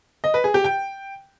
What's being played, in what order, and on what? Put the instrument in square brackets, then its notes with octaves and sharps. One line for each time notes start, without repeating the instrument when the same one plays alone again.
[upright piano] D#5
B4
G#4
G4
G5